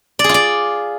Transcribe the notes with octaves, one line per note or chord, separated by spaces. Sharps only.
D5
G#4
F4
D5